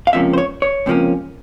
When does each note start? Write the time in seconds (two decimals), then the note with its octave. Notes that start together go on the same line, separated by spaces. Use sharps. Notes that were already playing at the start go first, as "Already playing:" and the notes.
0.07 F5
0.13 C#2 C3 F3 A#3 C#4 E5
0.33 C5
0.38 C#5
0.62 C#5
0.86 C#2 C3 F3 A#3 C#4